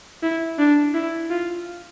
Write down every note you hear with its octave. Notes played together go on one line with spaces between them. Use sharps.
E4
D4
E4
F4